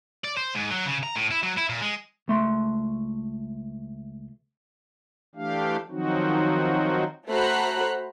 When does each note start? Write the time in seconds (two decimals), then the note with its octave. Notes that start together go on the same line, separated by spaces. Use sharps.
0.25 D5
0.37 C5
0.55 G#2
0.71 F#3
0.86 C#3
1.03 A#5
1.16 A2
1.31 E4
1.43 F#3
1.57 E4
1.69 A#2
1.81 G#3
2.28 C#2 A3 C6
5.35 E3 A3 D4 G4 F5
5.89 D#3 F3 F#3 C4 D#4 F#4
7.29 A3 F#4 C5 A#5 B5 F#6